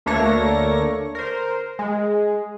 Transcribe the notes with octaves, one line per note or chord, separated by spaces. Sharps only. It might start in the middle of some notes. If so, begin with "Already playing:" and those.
D2 A3 A#3 D4 C#5 A#6
A#4 C5
G#3